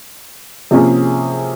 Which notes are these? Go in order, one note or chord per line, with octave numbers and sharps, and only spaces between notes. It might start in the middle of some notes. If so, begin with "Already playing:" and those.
C3 F3 A#3 C#4 G#4